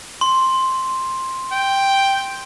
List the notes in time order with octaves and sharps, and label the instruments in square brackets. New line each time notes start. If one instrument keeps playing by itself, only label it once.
[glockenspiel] C6
[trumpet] G5